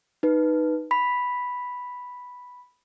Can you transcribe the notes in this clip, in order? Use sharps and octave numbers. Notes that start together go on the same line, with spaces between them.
D#4 B4
B5 B6